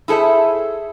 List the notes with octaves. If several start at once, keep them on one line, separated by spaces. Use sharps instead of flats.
E4 G#4 A4 C5 E5